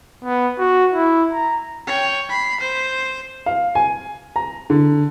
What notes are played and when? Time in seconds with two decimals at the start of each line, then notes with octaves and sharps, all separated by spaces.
0.24 B3
0.58 F#4
0.93 E4
1.33 A#5
1.87 C#5 G5
2.29 B5 C7
2.61 C5
3.46 F5
3.75 G#5
4.36 A#5
4.70 D3